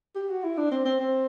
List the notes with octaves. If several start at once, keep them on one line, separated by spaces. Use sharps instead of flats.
G4
F#4
E4
D4
C4
C4
C4